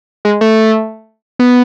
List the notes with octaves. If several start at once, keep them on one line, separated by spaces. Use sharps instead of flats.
G#3
A3
B3